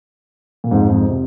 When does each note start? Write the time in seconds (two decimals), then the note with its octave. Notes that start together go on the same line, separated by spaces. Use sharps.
0.64 A#2
0.71 F2 G#2
0.90 F2 G#2
1.09 C3